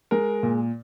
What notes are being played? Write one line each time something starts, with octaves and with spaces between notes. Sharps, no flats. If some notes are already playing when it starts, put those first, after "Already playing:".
G#3 A#4
A#2